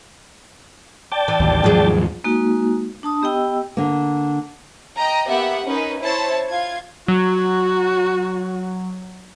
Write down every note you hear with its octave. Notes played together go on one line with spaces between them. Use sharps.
D5 G5 A5
E3
A1 D#2
D#2 G#2 F3 F#3 G#4
G#3 A#3 D#4 F#4
D4 A5 D#6
B3 G4 D#5 G5 E6
D3 A#3
D#5 G5 A#5
A#3 B3 G4 E5 F#5
C#4 D#4 A#4 B4
E4 C5 C#5 A5
F4 F5 G#6
F#3 F#4